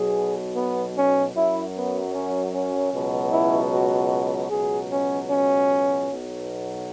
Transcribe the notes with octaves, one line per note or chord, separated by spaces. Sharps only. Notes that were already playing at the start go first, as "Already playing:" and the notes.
Already playing: B1 B2 F#3 G#4
B3
C#4
F#2 F#3 E4
B3
C#4
C#4
C#2 B2 F#3
E4
F#4
C#2 B2 F#3 G#4
C#4
C#4
B1 B2 F#3